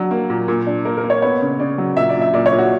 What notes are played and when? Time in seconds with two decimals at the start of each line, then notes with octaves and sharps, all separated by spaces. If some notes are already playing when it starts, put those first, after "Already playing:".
Already playing: F#3 D4
0.11 A#3
0.30 A#2
0.48 A#2
0.67 D4
0.85 A#3 A#4
0.97 A#4
1.04 A#3
1.10 C#5
1.22 B3 C#5
1.41 C#3
1.59 C#3 D5
1.78 F#3
1.97 A#2 E5
2.09 D5
2.15 A#2
2.21 E5
2.34 A#2 D5
2.46 C#5
2.52 A#2
2.58 F#4